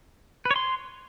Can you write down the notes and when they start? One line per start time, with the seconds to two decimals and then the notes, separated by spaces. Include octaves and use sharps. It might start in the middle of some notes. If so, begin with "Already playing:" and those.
0.45 B4
0.51 C#5
0.56 C6